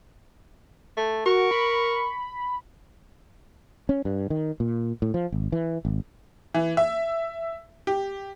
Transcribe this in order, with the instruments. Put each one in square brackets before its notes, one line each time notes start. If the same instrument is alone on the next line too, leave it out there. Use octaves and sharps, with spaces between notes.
[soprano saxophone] A3
[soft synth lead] F#4 [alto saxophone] A#4 [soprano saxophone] C#6
[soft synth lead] B5
[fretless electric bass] C#4
G2
D#3
A#2
A2
F3
G#1
E3
G#1
[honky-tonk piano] E3
E5
G4